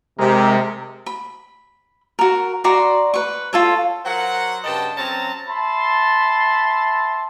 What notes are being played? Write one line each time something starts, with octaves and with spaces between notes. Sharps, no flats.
C3 G#3 A#4
B5
F#4 A#4
F#4 D5 A#5 C6
B4 C#6
F4 A4 C#5
F#3 A#4 C5 F#5
G2 C#3 D#5 G5 A5
F#3 C4 C#4 A5 A#5
E5 A5 B5 C6